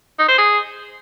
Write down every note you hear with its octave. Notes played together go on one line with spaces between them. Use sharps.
D#4
C5
G#4